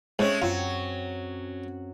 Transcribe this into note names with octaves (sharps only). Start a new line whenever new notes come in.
G#2 G#3 A3 C4 C#4 C#5
F#2 F#3 C4 F4